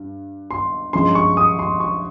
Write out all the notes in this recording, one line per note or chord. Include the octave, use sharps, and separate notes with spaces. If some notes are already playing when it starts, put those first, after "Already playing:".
Already playing: G2
C6
G2 F3 G#3 C#4 C6
C#6
D#6
C6
C#6